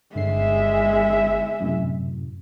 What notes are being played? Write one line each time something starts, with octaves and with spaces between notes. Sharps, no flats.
G1 D3 G#3 E5 C7
F#2 A2 C3